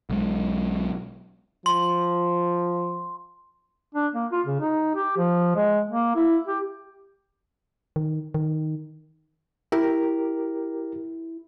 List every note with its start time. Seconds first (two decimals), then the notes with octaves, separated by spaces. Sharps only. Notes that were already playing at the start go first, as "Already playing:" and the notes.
0.10 B1 G#3
1.66 F3 C6
3.95 D4
4.14 A#3
4.32 F4
4.46 C#3
4.60 D#4
4.95 G4
5.17 F3
5.56 G#3
5.89 A#3
6.16 E4
6.47 G4
7.96 D#3
8.34 D#3
9.72 E4 G4 A#4